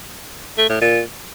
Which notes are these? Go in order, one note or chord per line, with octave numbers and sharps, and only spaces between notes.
A3
A2
A#2